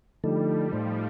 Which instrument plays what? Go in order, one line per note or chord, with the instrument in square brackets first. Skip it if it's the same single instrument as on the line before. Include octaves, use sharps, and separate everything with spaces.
[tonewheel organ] D3 F3 A3 D#4 A4 [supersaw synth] G3
[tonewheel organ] A2 A3 D#4 [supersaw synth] F3